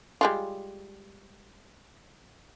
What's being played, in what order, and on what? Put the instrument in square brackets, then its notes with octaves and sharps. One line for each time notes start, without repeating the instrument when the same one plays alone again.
[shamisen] G3 G#3 F4